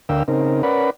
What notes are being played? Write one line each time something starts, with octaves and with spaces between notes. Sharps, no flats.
D2 D3 A#4 F5 G5 E6
C#3 C4 D#4 A#4
C#4 A#4 B4 D5 F#5 B5